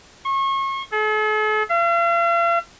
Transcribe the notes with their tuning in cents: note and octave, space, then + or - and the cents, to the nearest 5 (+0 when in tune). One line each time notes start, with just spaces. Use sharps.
C#6 -35
A4 -45
F5 -45